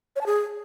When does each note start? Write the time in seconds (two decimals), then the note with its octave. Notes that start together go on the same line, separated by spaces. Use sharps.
0.16 C#5
0.21 A5
0.26 G#4